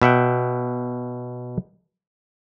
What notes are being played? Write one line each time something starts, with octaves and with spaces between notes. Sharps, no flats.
B2 E5 F#5 G5